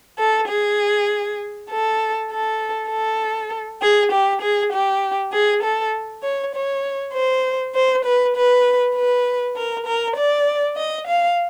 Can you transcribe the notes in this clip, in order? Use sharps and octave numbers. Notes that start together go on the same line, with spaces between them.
A4
G#4
A4
A4
A4
G#4
G4
G#4
G4
G#4
A4
C#5
C#5
C5
C5
B4
B4
B4
A#4
A#4
D5
D#5
F5